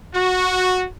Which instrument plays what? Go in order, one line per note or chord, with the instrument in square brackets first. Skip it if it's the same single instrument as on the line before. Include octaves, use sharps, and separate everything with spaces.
[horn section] F#4